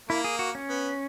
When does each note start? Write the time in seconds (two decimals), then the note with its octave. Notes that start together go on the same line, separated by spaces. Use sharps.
0.09 A#3 E4
0.24 G#4
0.39 F#4
0.55 C#4
0.69 B3